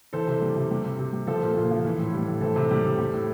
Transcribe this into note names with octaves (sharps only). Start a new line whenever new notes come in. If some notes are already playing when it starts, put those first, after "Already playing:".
E3 A4 C5
C3
G3
C3
G3
C3
C3
G3
F3 A4 C5
A#2
A#2
F3
E3
A2
G3
A2
E3 A4 C5
C3
G3
C3
G3
A2